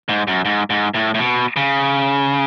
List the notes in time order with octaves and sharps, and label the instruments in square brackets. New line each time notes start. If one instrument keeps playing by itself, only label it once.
[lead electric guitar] G#2
F#2
G#2
G#2
A2
A2
B2
C#3